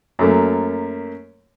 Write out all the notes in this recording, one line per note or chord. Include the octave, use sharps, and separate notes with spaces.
F#2 A3 A#3